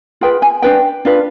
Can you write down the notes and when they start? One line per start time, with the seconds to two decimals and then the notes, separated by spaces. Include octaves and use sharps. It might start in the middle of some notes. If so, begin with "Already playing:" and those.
0.21 F4 G#4 B4 G5
0.42 G#5
0.62 D4 F4 B4 G5
1.05 D4 F4 B4